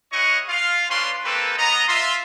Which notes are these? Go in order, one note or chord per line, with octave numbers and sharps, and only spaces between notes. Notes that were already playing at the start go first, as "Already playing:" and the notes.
E4 G#4 C#5 D#5 F#5 C#6
F4 F5
C#4 D4 F4 B4 C6
A#3 C4 G4 A4 B4
B3 D#5 A#5
F4 E5 C6